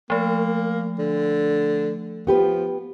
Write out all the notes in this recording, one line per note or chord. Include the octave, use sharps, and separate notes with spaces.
F3 A3 A#3
D3
F3 B3 G4 B4